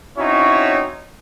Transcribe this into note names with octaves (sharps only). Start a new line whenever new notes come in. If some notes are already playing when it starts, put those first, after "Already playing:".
C4 C#4 D#4 E4 F#4 C#5